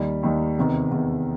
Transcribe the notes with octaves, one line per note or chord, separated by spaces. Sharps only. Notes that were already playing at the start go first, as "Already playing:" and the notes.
Already playing: D#2 D#3 G3
D#2 D#3 G3
E2 C3 D#3
E2 C3 D#3